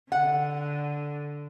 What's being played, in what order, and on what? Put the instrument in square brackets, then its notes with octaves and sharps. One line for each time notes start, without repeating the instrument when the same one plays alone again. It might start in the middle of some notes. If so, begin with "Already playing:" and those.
[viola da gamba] D3 [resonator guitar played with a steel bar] F#5